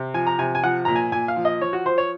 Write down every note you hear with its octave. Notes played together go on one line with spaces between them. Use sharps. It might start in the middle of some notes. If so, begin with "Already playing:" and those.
Already playing: C3
F3 G#5
A#5
C3 G#5
G#5
F3 F#5
A#2 A#5
G#5
A#2 G#5
F5
F3
D#5
F3 C#5
F#4
F3 C5
C#5